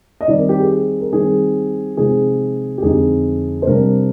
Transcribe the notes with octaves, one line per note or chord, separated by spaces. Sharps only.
D#5
D#3 G3 C4 D#4 D5
A#4
G4
G#4
A#4
D#3 G3 C4 D#4 G#4
C3 F3 G#3 C4 D#4 G#4
G4
F2 D3 G#3 D#4 G#4
C5
C3 G3 D4 A#4